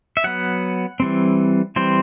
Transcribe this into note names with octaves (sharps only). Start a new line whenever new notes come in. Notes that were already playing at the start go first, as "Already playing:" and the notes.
E5
F#3 B3 F#5
E3 G3 C4
E3 G3 C4 C5